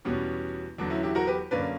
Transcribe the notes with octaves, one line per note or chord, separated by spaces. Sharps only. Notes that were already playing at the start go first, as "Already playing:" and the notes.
E2 B2 G3 B3 C#4
E2 D3 F#3 B3 D4
C#4 E4
E4 G4
F#4 A#4
G4 B4
F#2 D3 A#3 C#4 B4 D5